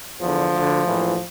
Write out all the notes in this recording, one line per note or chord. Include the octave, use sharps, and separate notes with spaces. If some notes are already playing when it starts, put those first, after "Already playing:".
E2 D3 F3
D2 D3
A#1 A2 E3